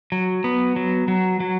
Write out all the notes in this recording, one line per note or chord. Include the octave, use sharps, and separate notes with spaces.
F#3
B3
F#3
F#3
F#3